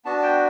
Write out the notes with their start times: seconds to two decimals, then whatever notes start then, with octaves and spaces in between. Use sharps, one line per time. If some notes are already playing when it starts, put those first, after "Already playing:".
0.05 B3 D4 F#4 A5
0.17 A5
0.23 G5